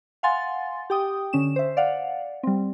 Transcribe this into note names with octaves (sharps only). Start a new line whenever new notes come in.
F5 F#5 G#5 C6 A6
G4 G5 D#6
D3 C#4 E7
C5 E5
D5 F5 F#5
G3 C4